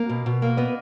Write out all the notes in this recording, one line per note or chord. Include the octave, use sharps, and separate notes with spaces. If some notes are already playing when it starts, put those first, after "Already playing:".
Already playing: A#3
B2
B2
A#3
B3 D#5